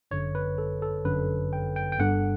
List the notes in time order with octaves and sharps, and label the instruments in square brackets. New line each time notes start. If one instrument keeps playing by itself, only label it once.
[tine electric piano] G1 F#2 D3 C#5
B4
A4
A4
G1 F#2 D3 B4
G5
G5
G5
G1 G2 D3 F#5